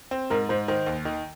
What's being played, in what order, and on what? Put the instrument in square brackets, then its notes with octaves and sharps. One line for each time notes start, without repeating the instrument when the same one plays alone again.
[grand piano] C4
[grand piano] G#2 [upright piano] A#4
[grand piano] G#2 [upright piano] C5
[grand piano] D#3 [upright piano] C5
[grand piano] D#2
D#3